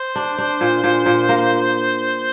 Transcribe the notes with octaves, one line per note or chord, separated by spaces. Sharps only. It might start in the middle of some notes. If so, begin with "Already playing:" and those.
Already playing: C5
D4
D4
A#2
A#2
A#2
A#3